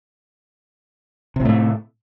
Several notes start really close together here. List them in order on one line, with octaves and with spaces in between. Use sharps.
C3 A2 A3